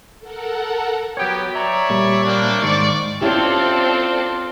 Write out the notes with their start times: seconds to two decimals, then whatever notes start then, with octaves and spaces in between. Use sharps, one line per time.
0.20 A4 A#4 F#5
1.17 F#3 B3 G4 C#5 G5
1.56 C#5 D5 E5 A#5
1.90 A#2 G3
2.25 A#3 C4 D4
2.63 G#2 D#3 C5 D5 C#6
3.21 C4 C#4 E4 F4 G4 A4 D5 C6